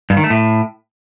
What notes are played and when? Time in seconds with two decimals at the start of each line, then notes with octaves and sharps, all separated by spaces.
0.10 G2
0.17 D#3
0.24 A3
0.30 A2